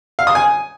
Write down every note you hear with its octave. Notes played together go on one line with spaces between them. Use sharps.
F5
D#6
G#5